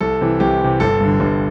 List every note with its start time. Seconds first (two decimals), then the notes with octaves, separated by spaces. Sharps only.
0.01 C2 A4
0.21 C3 E3
0.40 C2 G4
0.61 C3 E3
0.80 G1 A4
1.01 G2 D3
1.20 G1